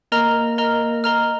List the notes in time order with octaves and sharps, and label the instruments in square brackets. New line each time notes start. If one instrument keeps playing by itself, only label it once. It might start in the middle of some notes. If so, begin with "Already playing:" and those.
[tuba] A#3 [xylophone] A#4 D#5 A#5 F6
[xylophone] A#4 D#5 A#5 F6
A#4 D#5 A#5 F6